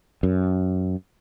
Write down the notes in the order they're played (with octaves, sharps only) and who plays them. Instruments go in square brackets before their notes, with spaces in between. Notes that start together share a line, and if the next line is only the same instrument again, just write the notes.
[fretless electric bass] F#2